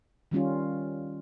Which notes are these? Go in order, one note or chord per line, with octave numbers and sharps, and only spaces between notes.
D#3 G3 C#4 F4